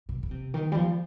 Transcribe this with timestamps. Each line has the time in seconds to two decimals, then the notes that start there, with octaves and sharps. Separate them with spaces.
0.09 C3
0.23 C#3
0.31 C3
0.54 D#3
0.72 G3
0.76 F3